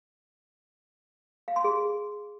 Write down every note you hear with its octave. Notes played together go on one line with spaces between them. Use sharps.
F5
C6
G#4